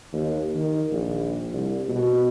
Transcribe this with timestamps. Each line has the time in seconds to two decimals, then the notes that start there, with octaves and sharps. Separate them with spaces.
0.12 D#2
0.54 D#3
0.91 A#1
1.52 C2
1.88 B2